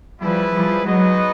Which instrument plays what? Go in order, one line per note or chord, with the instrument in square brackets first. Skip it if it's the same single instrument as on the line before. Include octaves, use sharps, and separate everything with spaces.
[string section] F3 G3 [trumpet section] E4 G#4 B4
[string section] F3 G3
[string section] F#3 G#3 [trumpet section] B3 D#4 F#4 B4 D#5